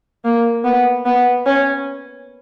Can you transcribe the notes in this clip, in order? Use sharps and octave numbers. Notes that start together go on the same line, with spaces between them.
A#3
B3
B3
C#4